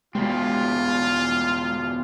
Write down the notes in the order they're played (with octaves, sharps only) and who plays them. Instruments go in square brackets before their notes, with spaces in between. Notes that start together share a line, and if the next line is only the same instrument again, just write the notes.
[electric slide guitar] E2 B2 C4 [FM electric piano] G#3 [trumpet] F4